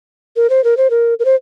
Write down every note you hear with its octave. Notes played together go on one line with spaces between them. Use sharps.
A#4
C5
A#4
C5
A#4
A#4
C5